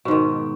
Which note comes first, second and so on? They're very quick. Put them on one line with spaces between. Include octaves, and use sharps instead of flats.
B2 G#2 D#3